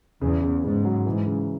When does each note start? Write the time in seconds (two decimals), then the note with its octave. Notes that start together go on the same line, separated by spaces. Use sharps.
0.21 E2 C#3
0.43 C#3
0.63 G#2 C#3
0.85 F#3
1.06 G#2 E3
1.26 C#3